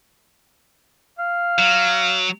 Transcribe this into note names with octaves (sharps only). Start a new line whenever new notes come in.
F5
F#3